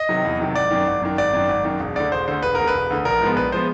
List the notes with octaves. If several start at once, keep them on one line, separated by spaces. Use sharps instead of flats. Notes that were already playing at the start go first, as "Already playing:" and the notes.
Already playing: D#5
C3 D#3 F#3
E2
C3 D#3 F#3
G#1 D5
F#2 D#3
G#1
F#2 D#3
G#1 D5
F#2 D#3
G#1
F#2 D#3
E1
D2 D3 D5
E1 C5
D2 D3 C5
E1 B4
D2 A#4
D3 B4
E1
D2 D3
A#1 A#4
G#2 F3 G#3 B3
A#1 B4
F3 G#3 B3 C5